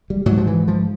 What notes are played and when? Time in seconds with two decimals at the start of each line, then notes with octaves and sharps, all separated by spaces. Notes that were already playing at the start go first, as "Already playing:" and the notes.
0.10 G3
0.26 G#2 F#3
0.37 F3
0.47 E3
0.68 F3